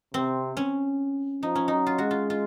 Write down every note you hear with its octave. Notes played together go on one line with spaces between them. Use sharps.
C3 C4
C#4
F3 D#4
C#4
F#3 D#4
F4
G#3 F#4
F4
F4